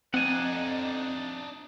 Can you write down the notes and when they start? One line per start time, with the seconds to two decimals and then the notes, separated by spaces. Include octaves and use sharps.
0.14 F2 C4 D4 D#4 F#5 G#5